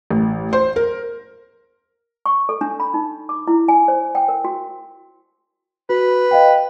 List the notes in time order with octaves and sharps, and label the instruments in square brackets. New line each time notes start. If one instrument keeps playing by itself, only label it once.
[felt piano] A1
C5
A#4
[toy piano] C#6
A4
D4
B5
D#4
D6
E4
G#5
C5
G5
A#4
F#4
[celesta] F#4 [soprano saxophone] B4
[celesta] D#5 F5 G5